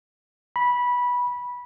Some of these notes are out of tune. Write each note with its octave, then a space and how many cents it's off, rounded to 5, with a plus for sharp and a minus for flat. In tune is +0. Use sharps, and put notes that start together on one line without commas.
B5 -15